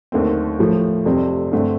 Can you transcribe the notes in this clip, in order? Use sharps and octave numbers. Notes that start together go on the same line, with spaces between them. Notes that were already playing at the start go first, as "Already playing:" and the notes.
D#2 D3 A3 C4
A2 F3 A3
F1 F2 C3 G3 C4
G2 D3 A3 C4